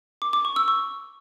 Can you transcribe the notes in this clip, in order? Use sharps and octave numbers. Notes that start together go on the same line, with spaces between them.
D6
D6
C#6
E6
C#6